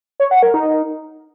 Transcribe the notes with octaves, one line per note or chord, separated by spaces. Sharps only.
C#5
F#5
A#4
D#4